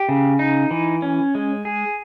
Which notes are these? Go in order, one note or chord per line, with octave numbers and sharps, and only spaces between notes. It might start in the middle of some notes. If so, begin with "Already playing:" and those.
Already playing: G4
C#3
D#4
E3
C#4
G#3
G#4